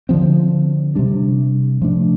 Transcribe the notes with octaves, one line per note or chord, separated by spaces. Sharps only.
D3 F3 C4
C3 G3 D4
C3 F3 A3 D4